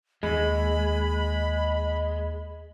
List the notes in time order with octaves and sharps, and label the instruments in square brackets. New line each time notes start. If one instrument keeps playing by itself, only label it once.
[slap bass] D#2 [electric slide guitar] G#3 [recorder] B5